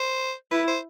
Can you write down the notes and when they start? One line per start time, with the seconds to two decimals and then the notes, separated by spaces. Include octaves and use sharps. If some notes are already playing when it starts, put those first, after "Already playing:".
Already playing: C5
0.51 E4 B4
0.68 C5